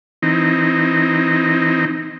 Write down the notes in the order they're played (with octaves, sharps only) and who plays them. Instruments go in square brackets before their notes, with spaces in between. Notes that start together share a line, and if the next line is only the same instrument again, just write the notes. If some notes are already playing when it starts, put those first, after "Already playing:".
[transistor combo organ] E3 C4 D#4